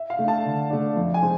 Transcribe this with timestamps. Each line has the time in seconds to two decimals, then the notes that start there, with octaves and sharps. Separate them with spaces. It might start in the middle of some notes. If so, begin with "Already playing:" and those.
Already playing: E5
0.10 F5
0.19 A3 D4
0.28 A5
0.45 D3
0.70 A3 D4
0.96 F2
1.14 G#5
1.22 G#3 C4